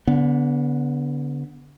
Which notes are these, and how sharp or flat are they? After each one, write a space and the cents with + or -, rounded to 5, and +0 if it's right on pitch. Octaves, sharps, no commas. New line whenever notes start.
D3 -30 B3 -5